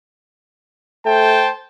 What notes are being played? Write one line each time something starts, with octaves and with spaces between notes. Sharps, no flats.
A3 C5 G5 A5